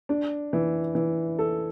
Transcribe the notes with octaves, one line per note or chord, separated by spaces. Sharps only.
D4
E3
E3
A4